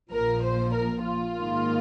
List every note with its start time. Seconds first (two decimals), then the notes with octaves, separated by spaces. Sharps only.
0.12 A#1 A#2 F3 A#4
0.43 C5
0.74 A#4
1.06 F4
1.36 G#2 D#3 A#3